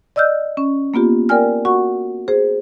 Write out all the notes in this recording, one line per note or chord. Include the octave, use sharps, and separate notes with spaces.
D5 D#5 E6 F6 G6
C#4
A#3 B3 F4 G4
A#4 D5 G5 G#5 F6
F#4 F#5 C#6
G#4 C5